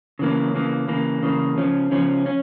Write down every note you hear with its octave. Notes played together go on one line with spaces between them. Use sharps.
C#3 E3 A#3
C#3 E3 A#3
C#3 E3 A#3
C#3 E3 A#3
C#3 F3 C#4
C#3 F3 C#4
C#4